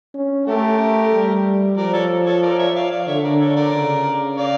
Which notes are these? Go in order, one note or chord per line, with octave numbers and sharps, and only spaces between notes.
C#4
A3 G4 A#4
G3
F3 A#4 D5
A4 C#5
A4 C#5
A#4 D5
C#5 E5
D5 F5
D5 F5
D3 C#5 E5
A#4 D5
A4 C#5
A#4 D5
C#3
D5 F5